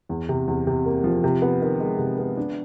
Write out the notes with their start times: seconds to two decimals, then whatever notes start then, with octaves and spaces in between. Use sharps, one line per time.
0.09 E2
0.29 C3
0.47 E2
0.67 C3
0.86 A#3
1.04 F3
1.24 C3
1.42 B3
1.62 D#3
1.80 G#3
1.99 C3
2.18 B3
2.37 D4